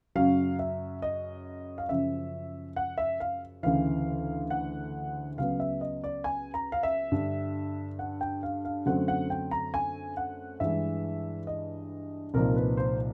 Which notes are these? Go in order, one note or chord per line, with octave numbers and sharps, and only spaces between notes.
F#2 C#3 F#3 F5
E5
D#5
F5
F#2 C#3 F3 E5
F#5
E5
F5
D2 C#3 E3 F5
F#5
C#2 C#3 F#3 B3 F5
E5
D#5
D5
G#5
A#5
F5
E5
G2 D3 G3
F#5
G5
F5
F5
F#2 D3 F#3 A3 C4 F#5
F#5
G5
A#5
G#5
F#5
G2 E3 G#3 E5
D#5
C2 A#2 F3 A#3 D#4 A#4
B4
C5